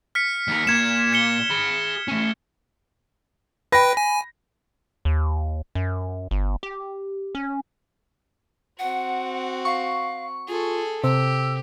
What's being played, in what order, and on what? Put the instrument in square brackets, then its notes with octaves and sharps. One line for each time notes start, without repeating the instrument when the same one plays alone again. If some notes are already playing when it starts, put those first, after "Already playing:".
[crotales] F6 B6 C#7
[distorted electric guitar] D#2 A#4
[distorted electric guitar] A#2 A#3 [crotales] G#6 E7
[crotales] G#6 C#7 G7
[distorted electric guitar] G#4 B5
A3 C#4
[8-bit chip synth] B4 G5 [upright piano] B5 A#6
[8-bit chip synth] G#5
[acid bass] D#2
F#2
G1
G4
C#4
[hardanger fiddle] C4 F#4 [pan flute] F#5
[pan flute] F5 [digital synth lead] C#6
[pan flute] F4 [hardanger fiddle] G#4 A4
[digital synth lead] C3 [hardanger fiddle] G4 [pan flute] E6